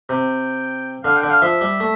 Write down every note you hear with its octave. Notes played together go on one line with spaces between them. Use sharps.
C3 G5
D3 F5
G5
D3
F5
F3 E5
G3
A3